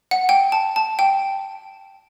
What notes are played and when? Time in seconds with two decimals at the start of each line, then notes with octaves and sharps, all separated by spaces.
0.11 F#5
0.29 G5
0.52 A5
0.76 A5
0.99 G5